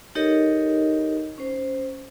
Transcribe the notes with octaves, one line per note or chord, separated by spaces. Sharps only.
D#4 G4 A4 A#4 C#5 D#5
C#4 C5